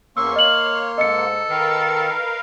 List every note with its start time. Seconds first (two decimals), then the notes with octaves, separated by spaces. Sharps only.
0.17 E2 A#3 C#4 C6 C#6 E6
0.36 C#5 D#5 F5 F#7
0.98 G#2 A4 D#5 C#7
1.50 D#3 A#4 B4 F5